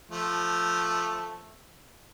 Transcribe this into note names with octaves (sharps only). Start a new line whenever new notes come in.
F3 A3